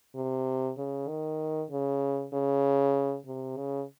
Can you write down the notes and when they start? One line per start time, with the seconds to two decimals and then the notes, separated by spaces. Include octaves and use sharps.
0.16 C3
0.78 C#3
1.08 D#3
1.71 C#3
2.33 C#3
3.27 C3
3.57 C#3